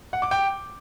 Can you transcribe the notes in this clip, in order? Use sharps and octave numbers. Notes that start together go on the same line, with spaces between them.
F#5
D6
G5